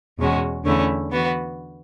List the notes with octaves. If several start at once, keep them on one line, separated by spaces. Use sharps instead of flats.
E2 B2 G#3 C#4 F#4
E2 D3 A3 C#4 E4
E3 B3 F#4